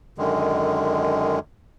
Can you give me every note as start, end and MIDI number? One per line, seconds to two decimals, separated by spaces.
0.18 1.39 42
0.18 1.39 50
0.18 1.39 51
0.18 1.39 56